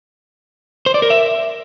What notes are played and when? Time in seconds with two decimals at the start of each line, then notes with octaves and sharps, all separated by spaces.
0.86 C5
0.94 D5
1.02 A#4
1.10 E5